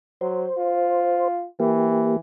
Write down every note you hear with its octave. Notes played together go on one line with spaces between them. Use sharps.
F#3 C5
F4
E3 A#3 G4